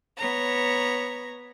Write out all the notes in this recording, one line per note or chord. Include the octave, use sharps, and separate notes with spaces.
B3 C#5 A#5